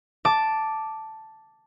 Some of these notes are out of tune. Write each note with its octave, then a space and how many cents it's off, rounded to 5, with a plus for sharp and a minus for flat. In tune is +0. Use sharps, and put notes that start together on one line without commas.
A5 +0 D6 +0